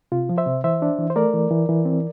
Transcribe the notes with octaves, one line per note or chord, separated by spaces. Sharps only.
C3 F4
F3
C5 E5
C3
E3 C5 E5
D4
E3
C5
A3 A#4 D5
E3
E3
E3
C4